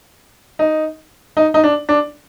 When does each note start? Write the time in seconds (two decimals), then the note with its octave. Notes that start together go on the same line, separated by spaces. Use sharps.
0.59 D#4
1.37 D#4
1.54 D#4
1.64 D4
1.89 D4